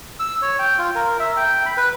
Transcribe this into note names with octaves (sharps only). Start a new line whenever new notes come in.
E6
C#5
G5
F4
A#4
E5
G5
B5
B4